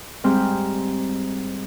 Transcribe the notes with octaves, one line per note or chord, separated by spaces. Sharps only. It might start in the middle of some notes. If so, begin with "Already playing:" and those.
G#2 G3 G#3 C4 G5 F6